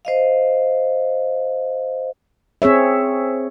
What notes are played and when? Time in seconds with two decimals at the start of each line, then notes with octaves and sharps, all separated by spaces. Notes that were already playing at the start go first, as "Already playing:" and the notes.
0.05 C5 D#5 F5
2.62 C4 G#4 C#5 E5